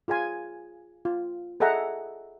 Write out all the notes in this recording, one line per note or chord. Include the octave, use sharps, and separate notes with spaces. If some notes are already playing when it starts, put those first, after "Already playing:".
F4 G#4 F5 G#5 C6
F4
G#4 A4 D#5 E5 F#5 A#5